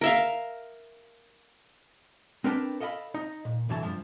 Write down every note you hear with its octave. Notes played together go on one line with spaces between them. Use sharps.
A#4 E5 F5
C4 D4 A#4 B4 G5 A5
A4 D#5 F5 G5 B5
D#4 D#5 A#5
A#2
B1 G2 E3 F#3 A5
G2 C3 F3